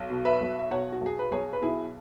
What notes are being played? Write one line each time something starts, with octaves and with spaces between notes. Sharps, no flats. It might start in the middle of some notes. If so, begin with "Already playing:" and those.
Already playing: B1
B2
B4 E5
B1
E5
B2 C#5 F#5
F#4
B1 G#4
B4
B1 G#4 C#5
B4
B2 E4 G#4